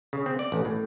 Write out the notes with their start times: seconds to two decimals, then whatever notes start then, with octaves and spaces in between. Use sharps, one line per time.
0.13 C#3
0.26 C4
0.39 D5
0.52 A1
0.65 A2